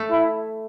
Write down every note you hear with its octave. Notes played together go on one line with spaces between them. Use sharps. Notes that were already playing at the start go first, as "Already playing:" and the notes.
Already playing: A3
E4